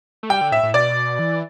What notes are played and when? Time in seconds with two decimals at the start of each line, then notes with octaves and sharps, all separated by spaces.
0.23 A3
0.30 G3 G5
0.41 D3
0.52 A2 E5
0.63 A2
0.74 B2 D5
1.19 E3